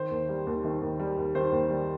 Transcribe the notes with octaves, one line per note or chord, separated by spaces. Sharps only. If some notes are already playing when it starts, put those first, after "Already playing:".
Already playing: D#3 C5
D#2
G3
D#2
D#3
D#2
G3
D#2
D#3 C5
D#2
G3